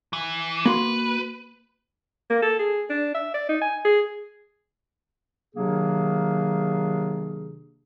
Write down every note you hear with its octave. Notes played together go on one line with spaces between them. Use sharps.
E3
A#3 F#4 B4 C6
A#3
A4
G#4
D4
E5
D5
D#4
G#5
G#4
C3 D#3 F#3 A#3 D4 G#4